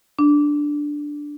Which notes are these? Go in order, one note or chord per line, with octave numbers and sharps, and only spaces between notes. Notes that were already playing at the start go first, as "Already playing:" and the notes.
D4